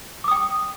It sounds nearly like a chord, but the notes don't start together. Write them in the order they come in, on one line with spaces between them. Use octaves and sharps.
D6 D#6 G5